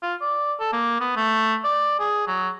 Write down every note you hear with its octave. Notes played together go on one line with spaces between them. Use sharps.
F4
D5
A4
A#3
B3
A3
D5
G#4
F#3